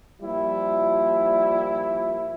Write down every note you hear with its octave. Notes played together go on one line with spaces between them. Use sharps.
A#2 F3 G3 E4